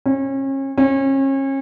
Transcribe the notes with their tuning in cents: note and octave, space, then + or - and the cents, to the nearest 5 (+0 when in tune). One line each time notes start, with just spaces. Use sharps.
C#4 -35
C#4 -35